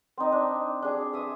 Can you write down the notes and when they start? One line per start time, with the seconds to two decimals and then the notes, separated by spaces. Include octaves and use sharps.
0.17 C4 D#4
0.32 D4
0.82 D4 G#4
1.13 E5 D#6